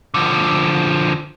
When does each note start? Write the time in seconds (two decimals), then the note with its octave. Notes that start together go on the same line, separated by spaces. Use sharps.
0.14 D3 F3